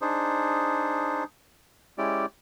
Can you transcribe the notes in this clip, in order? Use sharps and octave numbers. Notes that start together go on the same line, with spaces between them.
D4 D#4 G#4 C5
G#3 C#4 E4 G4 D5